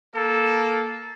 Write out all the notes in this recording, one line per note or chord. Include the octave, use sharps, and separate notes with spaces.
A#3 A4